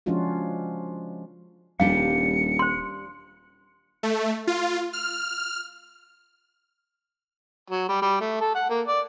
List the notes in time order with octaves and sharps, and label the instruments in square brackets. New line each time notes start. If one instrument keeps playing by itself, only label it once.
[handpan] F3 G#3 C#4 D4 F4 F#4
[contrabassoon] D#1 [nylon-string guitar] G3 D4 G4 [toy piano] F5 [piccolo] C#7
[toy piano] C5 C6
[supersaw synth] A3
F4
F6
[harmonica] F#3
G3
G3
A3
A4
F#5
A#3
D5